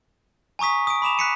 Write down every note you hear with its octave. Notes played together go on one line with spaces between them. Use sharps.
G#5 A#5 C#6 D#6 B6
D#6 D7
B5 D6 E7 F7
F#6 B6 C#7 D#7